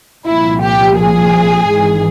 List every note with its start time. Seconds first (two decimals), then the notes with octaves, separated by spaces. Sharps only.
0.25 C2 A#2 F3 E4
0.62 G4
0.99 G#4
1.71 G#1 G#2 E3